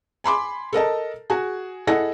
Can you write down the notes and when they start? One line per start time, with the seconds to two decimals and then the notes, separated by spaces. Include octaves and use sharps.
0.24 G#5 B5 C6 D6
0.73 A4 A#4 D#5 A5
1.30 F#4 G#4
1.87 E4 G#4 A4 D#5 F#5 A#6